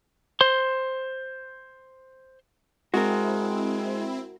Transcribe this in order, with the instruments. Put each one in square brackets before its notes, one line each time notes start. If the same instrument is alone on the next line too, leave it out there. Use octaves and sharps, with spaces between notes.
[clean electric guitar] C5 C6
[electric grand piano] G#3 [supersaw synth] C4 E4 [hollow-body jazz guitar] F#4 A#4